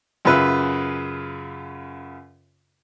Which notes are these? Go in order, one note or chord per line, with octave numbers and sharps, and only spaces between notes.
F#2 C#3 F4 B4 E5